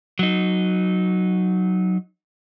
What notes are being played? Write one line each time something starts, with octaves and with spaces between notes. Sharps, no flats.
F#3 D#4